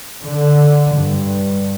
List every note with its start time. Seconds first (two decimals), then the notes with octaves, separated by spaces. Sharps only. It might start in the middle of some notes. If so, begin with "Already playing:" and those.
0.23 D3
0.97 G2